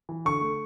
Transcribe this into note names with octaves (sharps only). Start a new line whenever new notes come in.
E3
D3 C#6
A3